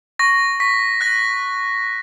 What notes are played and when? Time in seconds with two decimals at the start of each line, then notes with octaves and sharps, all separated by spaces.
0.19 C#6 A#6
0.60 C#6 B6
1.01 F#6 A#6